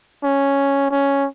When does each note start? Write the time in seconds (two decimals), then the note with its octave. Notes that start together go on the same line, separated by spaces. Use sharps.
0.24 C#4
0.91 C#4